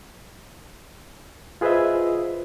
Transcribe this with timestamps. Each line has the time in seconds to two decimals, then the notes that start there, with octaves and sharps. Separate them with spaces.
1.61 F4 G#4 B4 C5 D#5 E5